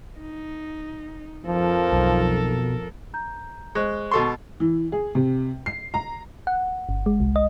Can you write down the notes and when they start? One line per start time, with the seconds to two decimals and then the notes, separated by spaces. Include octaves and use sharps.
0.19 D#4
1.46 F2 F3 A4 A#4
1.92 B1
3.14 A#5 G6
3.75 G#3 C5 C#6 F#6
4.12 B2 A4 C6 C#6
4.60 E3
4.92 G#4
5.15 C3
5.66 C7
5.94 A#5
6.47 F#5
6.89 G1
7.06 G#3
7.20 C2
7.36 D#5